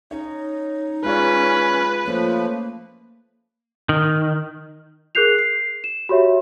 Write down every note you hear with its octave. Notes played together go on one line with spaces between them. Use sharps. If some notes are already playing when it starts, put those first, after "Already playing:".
C#4 D#4 C#5
G#3 C#4 F4 B4 D5
F3 A3 A#3 C#4
D#3
G#4 A#4 F#6 G6 C7 F7
C7
E7
F#4 G4 C#5 E5